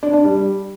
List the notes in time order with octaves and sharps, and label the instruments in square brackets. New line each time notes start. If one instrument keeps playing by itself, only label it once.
[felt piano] D4
D4
G3